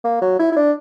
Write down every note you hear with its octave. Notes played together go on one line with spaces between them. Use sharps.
A#3
F#3
E4
E4
D4